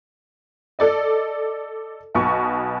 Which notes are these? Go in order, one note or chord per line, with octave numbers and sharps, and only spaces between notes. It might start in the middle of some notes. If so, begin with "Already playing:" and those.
A4 D5 D#5
B1 B2 C#6